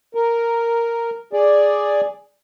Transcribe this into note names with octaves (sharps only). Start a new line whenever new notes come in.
A#4
G#4 D5